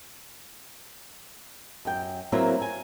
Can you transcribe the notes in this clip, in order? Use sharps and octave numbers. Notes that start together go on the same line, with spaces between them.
F#2 G5
F#3 A#3 C4 E4 B4
G#5